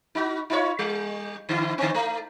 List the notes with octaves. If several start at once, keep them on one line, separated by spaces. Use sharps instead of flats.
D#4 F#4
D#4 F4 C#5
G3
D3 E4
D3 C4
A3